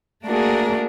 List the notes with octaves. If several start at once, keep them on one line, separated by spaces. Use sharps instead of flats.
A3 A#3 D4 F#4 G#4 A#4